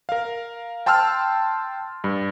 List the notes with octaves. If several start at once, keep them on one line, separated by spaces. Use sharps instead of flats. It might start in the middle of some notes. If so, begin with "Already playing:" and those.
A#4 F5
G5 A5 C6 E6 F6
G2